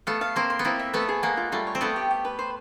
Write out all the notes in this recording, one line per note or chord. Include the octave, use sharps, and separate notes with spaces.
A3 B3 F5
F5
A#3 C4 C5
C6
B3
A#3 C4 E4
E5
A3 B3 B4
G#4
G#3 A#3 F#5
F4
G3 A3 F4
C#5
C4
A3 B3 G5
G4
G4
B4
C5